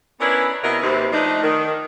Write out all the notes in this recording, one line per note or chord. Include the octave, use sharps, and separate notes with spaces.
B3 C#4 D4 E4 A#4 B4
C3 B3 E4 F#4 A#4 D#5
D#2 C3 B4
F3 A3 D4 D#4
D#3